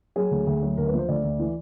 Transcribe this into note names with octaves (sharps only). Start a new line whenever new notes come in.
F#3 G#4
D2
D2
F#3
D2 A#4
B4
F3
C5
D2 D5
D2
E3